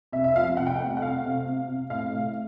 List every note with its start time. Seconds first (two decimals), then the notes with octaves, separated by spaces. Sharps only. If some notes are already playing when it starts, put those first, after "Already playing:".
0.12 C3 E5
0.24 E5
0.35 F3 F5
0.57 C3 F#5
0.67 G5
0.76 A3 F#5
0.97 F#5
1.01 C3 F5
1.24 C3
1.46 C3
1.68 C3
1.90 A2 F5
2.12 A2